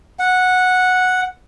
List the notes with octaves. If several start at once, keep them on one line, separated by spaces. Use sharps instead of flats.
F#5